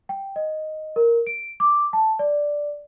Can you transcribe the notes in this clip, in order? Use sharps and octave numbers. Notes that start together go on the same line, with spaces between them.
G5
D#5
A#4
D7
D6
A5
D5